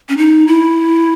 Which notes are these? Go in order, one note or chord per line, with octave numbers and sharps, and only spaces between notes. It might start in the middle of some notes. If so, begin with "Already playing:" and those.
C#4
D#4
E4